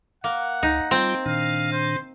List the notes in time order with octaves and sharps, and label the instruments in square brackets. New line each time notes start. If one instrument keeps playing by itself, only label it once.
[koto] A#3 [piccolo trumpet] F#5
[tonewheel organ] C#2 [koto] D#4
[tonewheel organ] G3 F4 [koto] C4
[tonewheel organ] A#2 D#3 D4 [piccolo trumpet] F5
[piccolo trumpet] C5